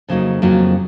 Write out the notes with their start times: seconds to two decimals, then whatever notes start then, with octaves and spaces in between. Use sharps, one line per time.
0.08 F2 C#3 F#3 A#3 D#4
0.42 F2 C#3 F#3 A#3 D#4